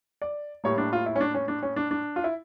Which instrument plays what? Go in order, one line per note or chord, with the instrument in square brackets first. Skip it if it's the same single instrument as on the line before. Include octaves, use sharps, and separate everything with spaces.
[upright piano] D5
A2 G3 A#3 C#5
D4
F4
E4
C#4
D4
C#4
D4
C#4
D4
D4
F4
E4